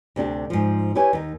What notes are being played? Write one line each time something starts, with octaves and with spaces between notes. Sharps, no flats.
D2 C3 D4 G4
G#2 F3
E4 G4 B4 C#5 G#5
D#2 D#4